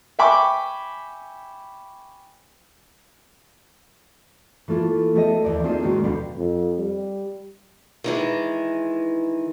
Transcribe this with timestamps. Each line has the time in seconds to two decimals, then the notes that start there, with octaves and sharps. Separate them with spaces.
0.19 E5 G5 G#5 B5 C#6 D6
4.68 E3 A3 A#3 F4
5.15 A3 B3 G4 G#4 D#5 E5
5.44 D#2 E3 G4 D5
5.63 A3 A#3 C4 D#4 F4 G#4
5.83 A#2 D#3 G#3 A#3 C#4 F#4
6.03 D2 B2 G3 D4 G4 F5
6.38 F2
6.78 G3
8.04 D#3 E3 G#3